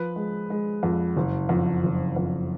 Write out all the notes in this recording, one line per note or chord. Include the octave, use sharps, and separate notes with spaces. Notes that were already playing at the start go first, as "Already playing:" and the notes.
Already playing: F3 B4
G#3
G#3
F2
F#1
F2
F#1
F2